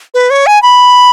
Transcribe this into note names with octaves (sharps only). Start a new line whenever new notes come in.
B4
C#5
G#5
B5